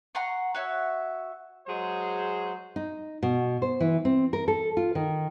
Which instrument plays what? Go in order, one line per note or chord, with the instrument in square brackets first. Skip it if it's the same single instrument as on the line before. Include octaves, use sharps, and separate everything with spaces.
[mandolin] F#5 A#5 C6 C#6
F#4 C#5 E5
[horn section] F#3 G#3 G#4 C5
[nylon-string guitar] D#4
B2
C5
E3
C4
A#4
A4
F4
D#3